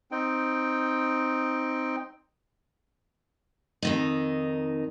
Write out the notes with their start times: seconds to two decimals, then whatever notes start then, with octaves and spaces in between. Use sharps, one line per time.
0.11 C4 D#4 G5
3.82 F2 D#3 D#4